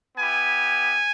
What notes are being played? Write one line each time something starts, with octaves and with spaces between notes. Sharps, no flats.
B3 E4 G4 G#5